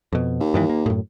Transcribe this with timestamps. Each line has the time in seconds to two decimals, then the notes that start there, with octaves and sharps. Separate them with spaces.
0.13 F2 B2
0.40 D#2
0.54 G2 D#3 E3
0.69 A#3
0.86 F#2 A2